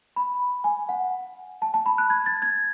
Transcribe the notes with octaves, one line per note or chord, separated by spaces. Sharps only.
B5
G#5
F#5
A5
A5
B5
F#6
G#6
A6
G#6